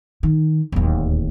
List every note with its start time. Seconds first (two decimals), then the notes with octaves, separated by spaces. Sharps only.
0.23 D#3
0.72 D1 D#2